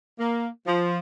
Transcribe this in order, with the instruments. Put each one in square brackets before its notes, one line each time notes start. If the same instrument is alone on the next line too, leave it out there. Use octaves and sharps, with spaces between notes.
[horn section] A#3
F3